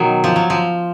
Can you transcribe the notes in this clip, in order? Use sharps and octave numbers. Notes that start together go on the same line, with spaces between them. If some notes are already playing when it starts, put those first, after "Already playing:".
Already playing: B2 D#3 F#3
F3
F#3
F3